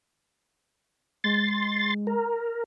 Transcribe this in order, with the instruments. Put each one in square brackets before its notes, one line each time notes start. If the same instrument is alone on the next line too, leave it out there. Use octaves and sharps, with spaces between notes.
[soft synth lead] G#3 [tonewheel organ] C6 A6
[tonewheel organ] A#4